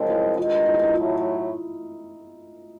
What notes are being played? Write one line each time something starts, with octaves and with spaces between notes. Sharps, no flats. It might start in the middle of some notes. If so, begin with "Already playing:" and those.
Already playing: F#2 C#3 F3 G#3 C4 D#4
E4
G2 D#3 G#3 F4
E4
D#4
E4
A2 F#3 A3 F4